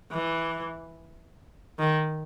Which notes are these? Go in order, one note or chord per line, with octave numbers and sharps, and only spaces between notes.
E3
D#3